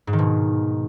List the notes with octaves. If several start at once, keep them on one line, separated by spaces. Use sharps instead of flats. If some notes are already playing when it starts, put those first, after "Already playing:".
G#2
D#3
B2